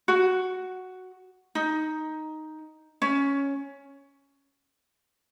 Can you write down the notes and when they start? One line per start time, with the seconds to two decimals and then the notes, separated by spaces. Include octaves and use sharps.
0.08 F#4
1.55 D#4
3.02 C#4